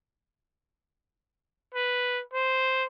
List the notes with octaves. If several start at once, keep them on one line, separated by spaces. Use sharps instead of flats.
B4
C5